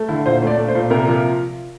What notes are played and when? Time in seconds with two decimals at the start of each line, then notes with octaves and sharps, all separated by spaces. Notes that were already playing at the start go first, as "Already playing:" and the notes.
Already playing: A3
0.08 D3 E4
0.25 A#2 C5
0.42 A3 D5
0.57 A3
0.68 C5
0.75 A#2
0.90 C3 A#4
1.07 F3